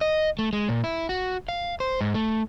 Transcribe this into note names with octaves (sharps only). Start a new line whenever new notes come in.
D#5
A3
G#3
A#2
E4
F#4
F5
C5
G#2
A3